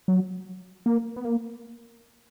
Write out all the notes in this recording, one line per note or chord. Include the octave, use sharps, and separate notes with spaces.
F#3
A#3
B3
A#3